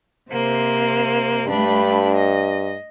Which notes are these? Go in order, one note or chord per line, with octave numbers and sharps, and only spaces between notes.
C3 A#3 C5
G2 A3 D4 B5
D#5